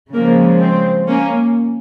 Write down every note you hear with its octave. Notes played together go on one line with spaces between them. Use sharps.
C#3 F3 G#3 A#3
C4
A#3 C#4